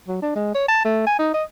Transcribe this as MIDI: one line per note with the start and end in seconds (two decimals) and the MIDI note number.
0.08 0.20 54
0.22 0.31 62
0.35 0.53 56
0.55 0.67 73
0.68 0.80 81
0.85 1.02 57
1.07 1.16 80
1.19 1.30 63
1.34 1.44 75